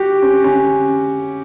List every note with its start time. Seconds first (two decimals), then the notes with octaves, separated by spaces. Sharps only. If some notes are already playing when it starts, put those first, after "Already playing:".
Already playing: F#4 G4
0.22 C#4
0.44 C#4